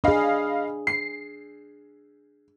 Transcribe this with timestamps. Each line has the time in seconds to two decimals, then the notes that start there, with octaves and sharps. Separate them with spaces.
0.04 D4 G#4 D#5 F5 B5
0.87 C7